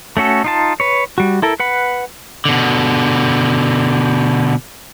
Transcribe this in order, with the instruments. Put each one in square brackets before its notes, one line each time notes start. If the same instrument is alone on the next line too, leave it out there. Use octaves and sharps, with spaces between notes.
[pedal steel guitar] A3 C#4 F#4 A4
D#4 F4 A5
B4 C#5
G3 F#4
E4 A4 A#4
B4 F#5 B5
[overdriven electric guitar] B2 D3